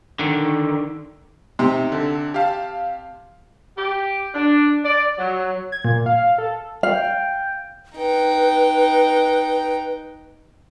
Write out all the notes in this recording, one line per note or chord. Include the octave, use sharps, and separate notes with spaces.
D3 D#3
C3 D#4
D3 A4
G4 F5 A5
G4
D4
D5
F#3
G#6
A#2
F5
A4
F5 G5
D#4 B4 G5